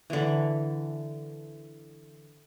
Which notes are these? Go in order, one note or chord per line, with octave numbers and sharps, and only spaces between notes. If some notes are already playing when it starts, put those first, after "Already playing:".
D3 E3